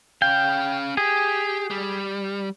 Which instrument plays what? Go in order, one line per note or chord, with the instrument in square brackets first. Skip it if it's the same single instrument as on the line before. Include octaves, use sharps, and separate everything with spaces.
[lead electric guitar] C#4 F5 [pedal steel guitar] G5
[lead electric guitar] G4 [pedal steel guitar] G#4
[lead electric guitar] G3